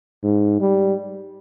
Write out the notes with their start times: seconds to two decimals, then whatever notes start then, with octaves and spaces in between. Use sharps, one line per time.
0.23 G#2
0.61 G3